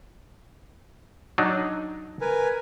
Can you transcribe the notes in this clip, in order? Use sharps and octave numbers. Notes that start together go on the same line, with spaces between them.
F#3 D4 D#4
A#4 B4 G#5